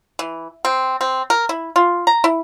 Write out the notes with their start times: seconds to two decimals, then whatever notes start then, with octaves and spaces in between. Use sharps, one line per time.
0.19 E3
0.65 C4
1.01 C4
1.30 A#4
1.49 E4
1.76 F4
2.07 A#5
2.24 E4